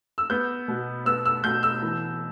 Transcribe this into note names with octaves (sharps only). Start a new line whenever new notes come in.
E6
B3 G6
B2
B3 E6
E6
B2 G6
E6
E3